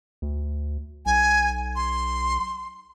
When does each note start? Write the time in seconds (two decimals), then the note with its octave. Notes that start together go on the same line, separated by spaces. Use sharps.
0.22 D2
1.06 B1 G#5
1.76 C6